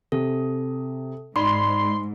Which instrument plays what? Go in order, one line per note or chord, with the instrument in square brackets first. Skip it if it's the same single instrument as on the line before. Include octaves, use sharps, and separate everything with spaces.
[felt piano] C3 [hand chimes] A4
[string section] G#2 [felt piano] D#4 [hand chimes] D5 B5 [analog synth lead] C6